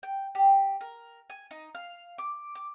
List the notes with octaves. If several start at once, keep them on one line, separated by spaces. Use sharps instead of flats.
G5
G4
A#4
G#5
D#4
F5
D6
D6